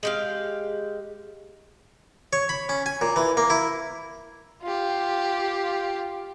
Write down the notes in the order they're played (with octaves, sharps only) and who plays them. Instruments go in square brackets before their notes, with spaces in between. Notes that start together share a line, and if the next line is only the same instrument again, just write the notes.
[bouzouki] G#3 G4 F5
[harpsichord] C#5
B5
C#4
G#5
A#2
E3
A#3
E4
[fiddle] F4 G4